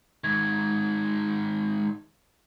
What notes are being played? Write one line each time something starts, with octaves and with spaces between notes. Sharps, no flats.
G#2 D#3 G#6